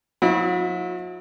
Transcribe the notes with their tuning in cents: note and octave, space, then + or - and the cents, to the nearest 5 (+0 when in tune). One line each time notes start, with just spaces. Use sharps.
F#3 -45 E4 -30